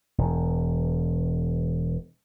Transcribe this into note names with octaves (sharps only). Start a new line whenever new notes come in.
E1 E2